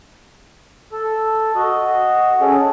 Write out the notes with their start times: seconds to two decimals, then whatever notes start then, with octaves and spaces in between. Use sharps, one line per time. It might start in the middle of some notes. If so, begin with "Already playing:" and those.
0.92 A4
1.55 F#4 D#5
2.41 C#4 G#4 A4